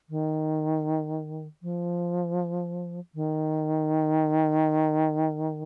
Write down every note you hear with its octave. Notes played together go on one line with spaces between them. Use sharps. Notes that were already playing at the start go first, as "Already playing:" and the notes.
D#3
F3
D#3